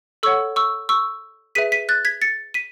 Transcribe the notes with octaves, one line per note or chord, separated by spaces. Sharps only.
A4 C#5 F#5 C#6 E6
C#6 E6
C#6 E6
G#4 B4 E5 B6 D#7
B6 D#7
F#6 A6
G#6 B6
A6 C#7
B6 D#7